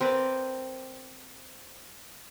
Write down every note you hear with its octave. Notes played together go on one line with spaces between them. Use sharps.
C4 A#4 B4 D5